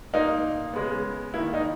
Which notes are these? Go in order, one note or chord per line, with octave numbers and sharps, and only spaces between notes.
A#2 A#3 D#4
C#3 G#3 B3
D#3 A#3 E4
D#4